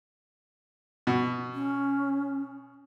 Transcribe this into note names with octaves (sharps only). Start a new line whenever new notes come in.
B2
C#4